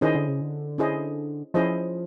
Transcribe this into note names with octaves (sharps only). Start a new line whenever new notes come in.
D#3 C#4 E4 G#4 C5 D#5
D3
C#3
D3
C#4 E4 G#4 C5 D#5
F3 C#4 E4 G#4 C5 D#5